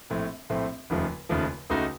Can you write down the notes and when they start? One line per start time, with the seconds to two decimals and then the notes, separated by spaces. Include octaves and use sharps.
0.10 A#1 A2 A3 C4
0.50 A#1 A2 A3 C4
0.90 F1 D#2 C#3 F3 A3
1.29 F1 D#2 C#3 F3 A3
1.70 C#2 C#3 A3 D#4 F#4